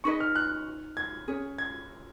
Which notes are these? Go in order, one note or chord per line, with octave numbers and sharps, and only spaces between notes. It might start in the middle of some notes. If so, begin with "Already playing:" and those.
D#4 G#4 B4 D#5 C#6
F6
F#6
G#6
C#4 G#4 C#5
G#6